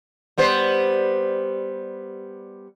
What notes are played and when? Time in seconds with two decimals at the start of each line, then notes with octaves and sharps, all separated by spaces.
0.38 G3 B3 C5